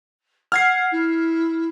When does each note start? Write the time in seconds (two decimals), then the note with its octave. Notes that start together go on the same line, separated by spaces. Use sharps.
0.52 F#5 F6 G#6 C7
0.91 E4